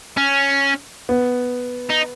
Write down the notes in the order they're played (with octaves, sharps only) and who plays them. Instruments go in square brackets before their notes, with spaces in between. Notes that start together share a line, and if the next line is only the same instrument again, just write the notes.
[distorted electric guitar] C#4
[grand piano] B3
[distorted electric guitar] D#4